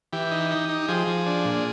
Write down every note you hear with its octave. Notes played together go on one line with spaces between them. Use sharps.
E3 G4
D#4
D#4
D#4
F3 G#4
F3
D4
A#2